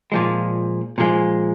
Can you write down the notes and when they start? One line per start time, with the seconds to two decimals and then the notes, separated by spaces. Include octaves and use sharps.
0.12 A#2 F3 G#3
0.98 A#2 F3 G#3